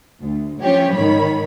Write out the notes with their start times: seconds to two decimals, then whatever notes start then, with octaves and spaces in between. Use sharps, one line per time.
0.23 D2
0.62 F3 C#4 G4 C#5
0.95 G#2 D#3 C#5 B5